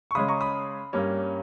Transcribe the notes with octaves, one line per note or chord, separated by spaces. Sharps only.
C#6
C#3 G#3 C#4 B5 D#6
A#5 C#6
B5 D#6
G2 G3 A#3 C#4